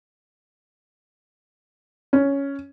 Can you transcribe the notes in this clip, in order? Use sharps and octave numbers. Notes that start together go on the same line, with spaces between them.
C#4